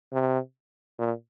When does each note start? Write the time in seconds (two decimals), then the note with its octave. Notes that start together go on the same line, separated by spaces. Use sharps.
0.13 C3
0.99 A#2